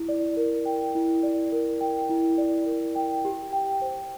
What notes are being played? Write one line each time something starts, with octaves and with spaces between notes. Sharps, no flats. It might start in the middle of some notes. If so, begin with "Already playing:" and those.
Already playing: E4
D5
A#4
G5
E4
D5
A#4
G5
E4
D5
A#4
G5
G4
G5
C5